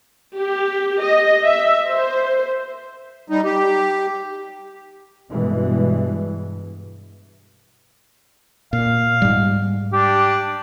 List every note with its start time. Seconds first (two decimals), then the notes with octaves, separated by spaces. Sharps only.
0.37 G4
1.03 D#5
1.44 E5
1.88 C5
3.29 G3 D#4
3.44 G4
5.30 G2 B2 E3 G#3
8.73 A#2 F5
9.22 G#2 G3
9.93 D4 G4